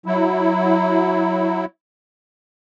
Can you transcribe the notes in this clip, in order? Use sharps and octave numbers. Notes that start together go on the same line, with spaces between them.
F#3 E4